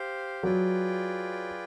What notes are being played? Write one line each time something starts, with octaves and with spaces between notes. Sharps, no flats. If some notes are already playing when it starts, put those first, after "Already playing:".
Already playing: G4 C5 F5
F#3 F4 G#4 B4 D5 G5